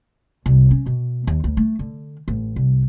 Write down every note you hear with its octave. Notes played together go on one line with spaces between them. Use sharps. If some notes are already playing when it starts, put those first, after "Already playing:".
C2
C#4
B2
D#2
D2
A3
D3
A1
C2